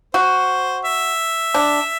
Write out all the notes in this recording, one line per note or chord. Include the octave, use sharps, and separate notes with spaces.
F#4 C5
E5
D4